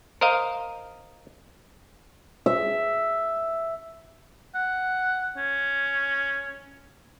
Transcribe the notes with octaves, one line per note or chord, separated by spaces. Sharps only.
A#4 C5 D#5 F5
E5
F#5
C#4